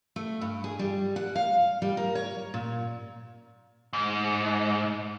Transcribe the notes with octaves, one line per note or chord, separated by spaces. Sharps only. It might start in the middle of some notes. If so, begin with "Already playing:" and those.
A3
G2
G#4
G3
F#5
F5
G3
A#4
C#5
A#2
G#2